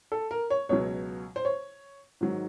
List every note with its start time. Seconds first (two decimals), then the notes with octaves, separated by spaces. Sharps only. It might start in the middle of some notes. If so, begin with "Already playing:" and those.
0.12 A4
0.31 A#4
0.50 C#5
0.69 C#2 B2 F#3 C#5
1.36 C5
1.45 C#5
2.21 G#2 D#3 F#3